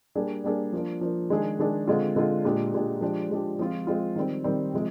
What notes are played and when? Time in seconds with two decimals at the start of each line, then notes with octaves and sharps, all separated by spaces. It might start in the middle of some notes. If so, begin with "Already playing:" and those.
0.15 G3 A#3 D4 G#4
0.44 G3 A#3 D4 G#4
0.73 F3 A#3 D4
1.01 F3 A#3 D4
1.30 D#3 G#3 D4 G#4
1.59 D#3 G#3 D4 G#4
1.87 D3 G#3 C4 F4
2.16 D3 G#3 C4 F4
2.45 A#2 G#3 D4 G4
2.74 A#2 G#3 D4 G4
3.01 F3 G#3 D4 G4
3.30 F3 G#3 D4 G4
3.59 F3 G#3 C4 F4
3.87 F3 G#3 C4 F4
4.16 D#3 G3 C4
4.44 D#3 G3 C4
4.73 C3 F3 G#3